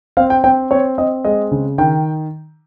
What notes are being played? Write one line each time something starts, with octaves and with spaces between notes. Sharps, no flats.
C4 F5
G5
C4 G5
C4 C#5
C4 D#5
G#3 D#5
C#3
D#3 G5